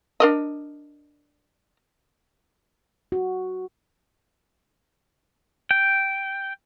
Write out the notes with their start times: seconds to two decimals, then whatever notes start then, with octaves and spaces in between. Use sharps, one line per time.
0.20 D4 A#4 D#5
3.12 F#4
5.71 G5